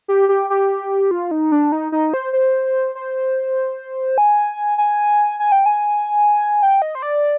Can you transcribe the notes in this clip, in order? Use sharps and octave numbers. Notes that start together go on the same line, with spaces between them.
G4
G4
G4
F4
D#4
D4
D#4
D#4
C5
C5
C5
G#5
G#5
G#5
G5
G#5
G5
D#5
C5
D5